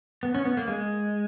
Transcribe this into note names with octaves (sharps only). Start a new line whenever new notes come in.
B3
C#4
B3
A#3
G#3